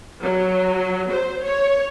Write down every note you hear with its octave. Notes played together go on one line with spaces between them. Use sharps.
F#3
C5
C#5